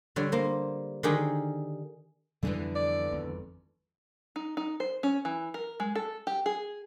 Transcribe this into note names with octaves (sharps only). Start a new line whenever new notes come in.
D3 G3 C#5
A#3 C5
D3 D#3 G4 G#4 A#4
F2 D3 E3 G3 B3 D4
D5
G#1 F2
D#4
D#4
C5
C#4
E3
A#4
G#3
A4
G4
G#4